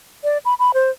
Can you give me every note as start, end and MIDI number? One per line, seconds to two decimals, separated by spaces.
0.24 0.38 74
0.45 0.54 83
0.59 0.72 83
0.74 0.90 72